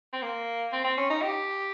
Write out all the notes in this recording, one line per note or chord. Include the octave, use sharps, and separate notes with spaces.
C4
A#3
C4
C4
C#4
D#4
G4